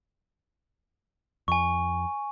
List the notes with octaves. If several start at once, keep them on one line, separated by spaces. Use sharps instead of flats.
F2 G#5 C#6